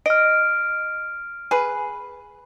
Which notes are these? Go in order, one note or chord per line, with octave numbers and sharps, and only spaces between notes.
D#5 F6 D7
G#4 B4